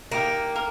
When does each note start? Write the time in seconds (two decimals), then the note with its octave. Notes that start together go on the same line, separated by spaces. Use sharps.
0.12 A#3 D#4 G4 A#4
0.56 A#4